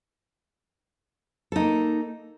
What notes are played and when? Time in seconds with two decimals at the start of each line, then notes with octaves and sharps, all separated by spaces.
1.52 A4
1.56 D#4
1.59 A#3